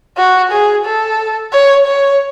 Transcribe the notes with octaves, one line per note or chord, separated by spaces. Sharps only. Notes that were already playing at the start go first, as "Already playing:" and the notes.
F#4
G#4
A4
C#5
C#5